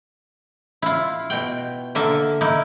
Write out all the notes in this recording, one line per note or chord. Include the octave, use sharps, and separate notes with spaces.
E4 F4
B2 G5
D3 A#3 E5 A5
A#3 D#4 E4